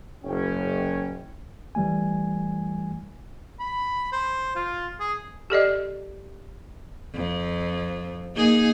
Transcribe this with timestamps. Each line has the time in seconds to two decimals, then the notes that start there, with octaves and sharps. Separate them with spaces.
0.25 F#1 C#4 G5
1.75 E3 G3 A3 G#5
3.60 B5
4.12 C5
4.56 F4
5.00 G#4
5.50 G4 A4 D5 D#5
7.15 F2
8.36 A#3 D#4 G#4